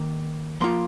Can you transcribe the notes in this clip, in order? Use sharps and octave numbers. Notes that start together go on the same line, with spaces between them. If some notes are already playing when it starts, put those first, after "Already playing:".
Already playing: D#3 A#3
F3 A#3 F4 C6